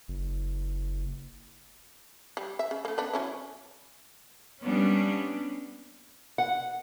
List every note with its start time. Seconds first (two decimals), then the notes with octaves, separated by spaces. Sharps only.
0.08 F#1
2.37 G3
2.59 E5
2.71 C#3
2.85 A3 A#3
2.98 B3 D4
3.14 F#3 C#4 E4
4.62 G3 A#3 B3 C#4 D4
6.38 F#5